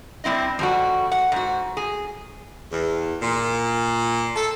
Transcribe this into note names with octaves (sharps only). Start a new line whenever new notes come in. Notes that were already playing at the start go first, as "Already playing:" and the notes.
G3 C4 E4 D#5
F2 G3 F#4
F#5
G#2 F#4
G#4
E2
A#2
A4